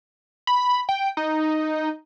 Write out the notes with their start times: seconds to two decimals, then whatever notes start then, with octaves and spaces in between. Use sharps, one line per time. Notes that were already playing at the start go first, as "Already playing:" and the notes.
0.47 B5
0.89 G5
1.17 D#4